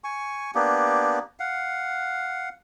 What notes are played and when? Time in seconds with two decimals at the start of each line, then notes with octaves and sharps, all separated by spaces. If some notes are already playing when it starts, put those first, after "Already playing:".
0.04 G#5 C#6
0.55 A#3 B3 D4 G4
1.40 F5 F#5